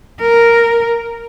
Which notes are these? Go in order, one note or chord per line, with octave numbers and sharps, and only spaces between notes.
A#4